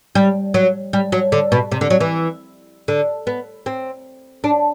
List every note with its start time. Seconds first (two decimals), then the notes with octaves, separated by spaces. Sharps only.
0.15 G3
0.54 F#3
0.93 G3
1.12 F#3
1.32 D3
1.52 B2
1.72 C3
1.81 D3
1.90 F#3
2.01 E3
2.88 D3
3.27 B3
3.66 C4
4.44 D4